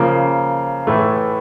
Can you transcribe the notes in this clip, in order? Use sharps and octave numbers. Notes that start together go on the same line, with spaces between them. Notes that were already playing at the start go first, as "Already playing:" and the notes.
Already playing: C#3 F3 A#3
A2 E3 A3